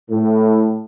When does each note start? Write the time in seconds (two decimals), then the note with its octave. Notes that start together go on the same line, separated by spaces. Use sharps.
0.11 A2